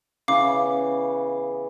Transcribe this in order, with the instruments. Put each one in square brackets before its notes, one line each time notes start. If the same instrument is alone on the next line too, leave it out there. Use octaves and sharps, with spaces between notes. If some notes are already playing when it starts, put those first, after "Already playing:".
[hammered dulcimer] C#3 E3 B3 [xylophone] F5 D6